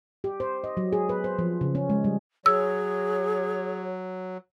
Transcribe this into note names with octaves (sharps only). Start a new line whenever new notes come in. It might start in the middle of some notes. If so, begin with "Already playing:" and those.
G4
C5
D#5
F#3
G#4
B4
C5
F3
C#3
C#4
G#3
G3
F#3 G#4 C#5 E6